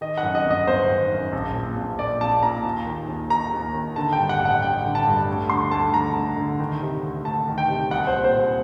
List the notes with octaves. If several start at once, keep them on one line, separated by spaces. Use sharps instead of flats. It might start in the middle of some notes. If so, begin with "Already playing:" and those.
D#3 D#5
F#5
F#2
D#5
G1
D#5
G1 C5
D#3
F#2
A#1
A#2
A#1
A#2 D5
A#1 A5
A#2 A#5
D#2
D#3
D#2
D#3 A#5
D#2
D#3
D3 A5
G5
G2
F#5
A1 F#5
A1 G5
D3
A5
G2
D2
D3 C6
D2 A5
D3 A#5
D2
D3
D#3
C3
D2
D2 A5
D#3
G5
C3
C2 F#5
C5
A#2
C5
C2